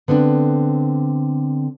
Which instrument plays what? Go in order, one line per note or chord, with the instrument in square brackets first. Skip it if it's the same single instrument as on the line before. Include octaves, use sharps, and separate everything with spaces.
[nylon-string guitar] D3 B3 C4 D4